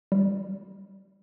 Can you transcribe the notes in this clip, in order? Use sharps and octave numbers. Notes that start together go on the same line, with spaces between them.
G3